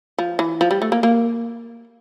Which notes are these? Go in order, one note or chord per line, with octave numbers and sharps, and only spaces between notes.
F3
E3
F3
G3
A3
A#3
A#3